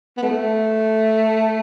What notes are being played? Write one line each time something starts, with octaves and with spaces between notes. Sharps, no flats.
B3
A3